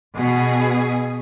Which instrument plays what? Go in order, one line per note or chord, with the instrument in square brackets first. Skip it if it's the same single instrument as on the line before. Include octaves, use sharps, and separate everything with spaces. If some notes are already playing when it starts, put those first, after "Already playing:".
[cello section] B2 G#4